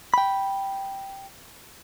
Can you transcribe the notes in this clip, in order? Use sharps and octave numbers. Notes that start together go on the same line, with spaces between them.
G5 B5